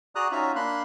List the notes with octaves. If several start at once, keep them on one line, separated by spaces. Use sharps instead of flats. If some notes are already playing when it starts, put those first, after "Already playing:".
F#4 G#4 D5 A#5 D#6 F#6
C#4 D#4 F4 F#4 E5 A#5
A#3 D4 B5 C6 F#6